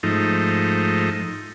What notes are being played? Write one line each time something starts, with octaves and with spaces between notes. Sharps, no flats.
G#2 F3 A3 D#4